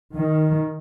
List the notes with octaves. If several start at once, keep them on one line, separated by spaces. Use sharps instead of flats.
D#3